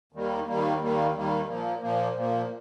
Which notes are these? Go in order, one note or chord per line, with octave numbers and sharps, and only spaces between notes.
D#2 D#3 G3 A#3
D#2 D#3 G3 A#3
D#2 D#3 G3 A#3
D#2 D#3 G3 A#3
A#2 F3 A#3
A#2 F3 A#3
A#2 F3 A#3